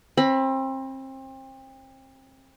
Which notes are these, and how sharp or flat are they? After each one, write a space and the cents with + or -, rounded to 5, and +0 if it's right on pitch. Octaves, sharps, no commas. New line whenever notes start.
C4 +30 B5 +0